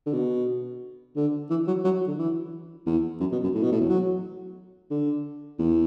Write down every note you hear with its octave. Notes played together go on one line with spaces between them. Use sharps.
D3
B2
D3
E3
F#3
F#3
D3
E3
E2
F#2
B2
F#2
A2
B2
A2
E2
F#3
D3
E2